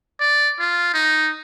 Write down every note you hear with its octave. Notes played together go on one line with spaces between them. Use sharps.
D5
F4
D#4